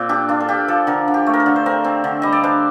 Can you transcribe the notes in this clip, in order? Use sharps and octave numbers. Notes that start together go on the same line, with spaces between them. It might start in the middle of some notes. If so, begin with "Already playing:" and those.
Already playing: A#2 C4
D4 G4
D4 F4
A4
F4 G4
F3 A4
D3 A#4
D3
G4
A3
A#4
A4
D3
C5
C4 A#4
C4
D3
G3 D#5
D5
D4 C5